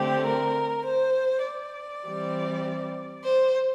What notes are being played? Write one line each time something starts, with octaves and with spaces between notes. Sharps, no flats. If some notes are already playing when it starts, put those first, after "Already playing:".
Already playing: D3 A3 C4 G4
A#4
C5
D5
E3 G3 C4
C5